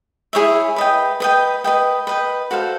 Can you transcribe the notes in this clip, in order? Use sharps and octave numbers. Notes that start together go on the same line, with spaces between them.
E4 G#4 C#5 E5
B4 D#5 G5
B4 D#5 G5
B4 D#5 G5
B4 D#5 G5
F#4 A4 C5 F5